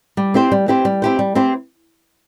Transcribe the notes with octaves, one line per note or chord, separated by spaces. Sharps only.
G3
C4 E4 G4 C5
G3
C4 E4 G4 C5
G3
C4 E4 G4 C5
G3
C4 E4 G4 C5